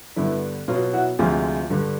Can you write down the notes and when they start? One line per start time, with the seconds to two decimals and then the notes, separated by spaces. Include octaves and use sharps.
0.16 G2 D3 G3 B3 E4
0.68 B2 F#3 B3 F4
0.93 E4 F#4
1.19 D2 C3 F3 G#3 F4 G4
1.70 G2 D3 G3